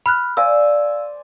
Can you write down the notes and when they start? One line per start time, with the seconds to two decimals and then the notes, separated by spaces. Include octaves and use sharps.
0.06 B5 F6 F#6
0.37 C5 D5 F5 G#5 E6